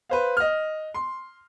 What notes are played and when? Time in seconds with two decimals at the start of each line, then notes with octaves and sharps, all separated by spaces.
0.10 B4 C5 F5
0.37 D#5 F6
0.94 C6